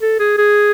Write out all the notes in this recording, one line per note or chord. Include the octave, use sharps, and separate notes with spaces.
A4
G#4
G#4